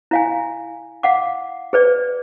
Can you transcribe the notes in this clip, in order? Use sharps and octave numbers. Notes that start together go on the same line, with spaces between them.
E4 F5 G#5
F5 F#5 D6
G#4 B4 D5